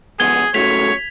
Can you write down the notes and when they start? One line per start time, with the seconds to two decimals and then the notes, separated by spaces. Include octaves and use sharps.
0.20 B1 F2 B3 G#4 G#6 G7
0.54 C#3 F#3 A3 C#5 B6 F7